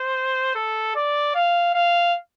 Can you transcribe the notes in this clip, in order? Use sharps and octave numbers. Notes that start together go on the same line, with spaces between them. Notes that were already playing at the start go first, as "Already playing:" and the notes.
Already playing: C5
A4
D5
F5
F5